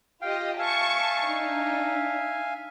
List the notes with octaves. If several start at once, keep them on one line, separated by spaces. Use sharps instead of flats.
F4 G4 D#5 F5 G5
E5 F5 G#5 A5 C#6
D4 D#4